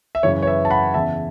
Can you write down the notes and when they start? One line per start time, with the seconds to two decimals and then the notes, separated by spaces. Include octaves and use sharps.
0.15 E5
0.23 F#2 C#3 E3 C#5
0.42 C#5
0.47 B4 E5
0.65 A5
0.70 F#5 B5
0.94 E2 C#3 E3 E5 A5